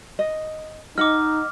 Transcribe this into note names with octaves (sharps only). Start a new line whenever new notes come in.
D#5
D#4 D#5 F#5 D6 F6